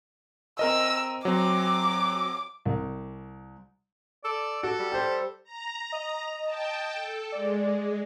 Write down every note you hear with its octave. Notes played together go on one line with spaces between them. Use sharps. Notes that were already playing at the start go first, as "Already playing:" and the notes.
C4 A#4 D#5 E6
F#3 C4 D6
C2
A4 D5
F#4 A4
G3
G4 C5
A#5
D#5
G5 A5
A4
G#3 D5